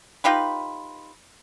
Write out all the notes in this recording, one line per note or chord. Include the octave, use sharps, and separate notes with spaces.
D#4 F4 G4 B4